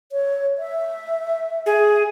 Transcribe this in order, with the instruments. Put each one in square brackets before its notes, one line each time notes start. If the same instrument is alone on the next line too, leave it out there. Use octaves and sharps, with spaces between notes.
[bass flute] C#5
E5
[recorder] G#4